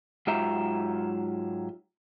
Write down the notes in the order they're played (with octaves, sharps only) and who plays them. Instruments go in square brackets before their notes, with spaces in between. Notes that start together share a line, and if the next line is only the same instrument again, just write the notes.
[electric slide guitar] G#2 F#3 F4 G4 E5 A#5